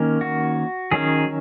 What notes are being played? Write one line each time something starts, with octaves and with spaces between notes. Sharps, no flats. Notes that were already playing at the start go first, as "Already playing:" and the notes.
Already playing: D#3 A#3 C#4
F#4
D#3 F#3 C#4 G#4